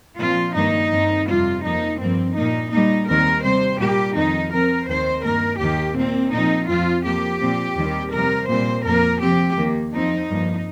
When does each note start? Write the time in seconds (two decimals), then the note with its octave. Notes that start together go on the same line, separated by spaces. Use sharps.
0.20 A#2 F3 C4 F4
0.56 G2 D#3 A#3 D#4
0.92 G2 D#3 C4
1.28 F2 C3 G3 C4 F4
1.64 F2 F3 A#3 D#4
2.00 G2 F3 A#3 C4
2.36 A#2 A#3 D#4
2.72 A#2 G3 A#3 D#4
3.08 D#2 D#3 G3 C4 A#4
3.44 C3 G3 C4 C5
3.80 A#2 G3 A#3 G4
4.16 F2 D#3 C4 D#4
4.52 C3 F3 C4 A#4
4.89 D#2 D#3 C4 C5
5.24 G2 D#3 A#3 A#4
5.60 D#2 D#3 A#3 G4
5.96 A#2 A#3 C4
6.32 A#2 F3 C4 D#4
6.68 F2 F3 C4 F4
7.04 F2 F3 A#3 G4
7.40 A#2 F3 C4
7.77 D#2 D#3 G3 C4
8.12 F2 C3 G3 A#4
8.48 A#2 G3 C4 C5
8.84 F2 F3 A#3 A#4
9.21 C3 F3 C4 G4
9.56 D#2 D#3 A#3
9.93 F2 F3 C4 D#4
10.29 G2 F3 A#3